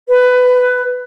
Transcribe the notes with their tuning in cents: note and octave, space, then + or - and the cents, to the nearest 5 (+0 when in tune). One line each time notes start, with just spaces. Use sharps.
B4 +15